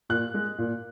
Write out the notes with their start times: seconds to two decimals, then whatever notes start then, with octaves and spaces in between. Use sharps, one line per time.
0.09 A#2 F#6
0.34 G#3
0.58 A#2